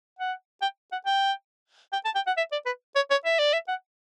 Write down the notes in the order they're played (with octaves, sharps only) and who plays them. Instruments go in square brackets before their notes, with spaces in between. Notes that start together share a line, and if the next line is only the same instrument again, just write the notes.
[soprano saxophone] F#5
G5
F#5
G5
G5
A5
G5
F#5
E5
D5
B4
C#5
C#5
E5
D5
E5
F#5